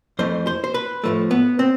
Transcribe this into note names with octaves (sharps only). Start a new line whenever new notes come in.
F2 E3 A3 C5
C5
C5
B4
A2 F3 A3
B3
C4